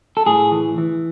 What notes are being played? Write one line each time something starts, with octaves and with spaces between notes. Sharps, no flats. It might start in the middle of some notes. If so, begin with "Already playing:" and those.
A4
A2 G#4
E3
E3